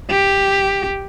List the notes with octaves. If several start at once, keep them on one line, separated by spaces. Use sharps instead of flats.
G4